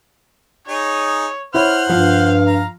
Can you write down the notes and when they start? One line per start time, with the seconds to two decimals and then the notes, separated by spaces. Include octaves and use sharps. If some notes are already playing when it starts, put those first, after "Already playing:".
0.68 D#4 G#4 C#5
1.54 E4 C5 C#5 F#5 F6
1.89 G2 F3 F5
2.47 A#5